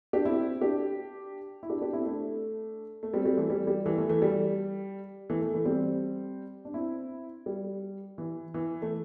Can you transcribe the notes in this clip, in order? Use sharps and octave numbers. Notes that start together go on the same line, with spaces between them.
D4 G4
C4 E4
D4 G4
E4
D4 G4
D4 G4
C4 E4
A3 D4
A3
G3 C4
G3 C4
E3 A3
G3
G3
E3 A3
E3 A3
E3 A3
G3
E3 A3
E3 A3
E3 A3
G3 C4
D4
C4 E4
G3
E3
E3
A3